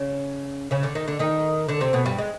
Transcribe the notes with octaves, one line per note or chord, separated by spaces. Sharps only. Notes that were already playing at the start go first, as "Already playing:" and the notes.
Already playing: C#3 C#4
C#3 C#4
D3 D4
D#3 D#4
D3 D4
D#3 D#4
D3 D4
C3 C4
B2 B3
G2 G3
G#3